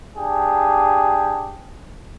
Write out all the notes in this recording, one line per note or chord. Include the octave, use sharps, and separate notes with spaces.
D4 G4 G#4